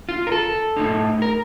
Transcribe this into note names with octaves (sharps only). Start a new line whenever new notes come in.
F4
A#4
A4
A2 A3 D#4
A#4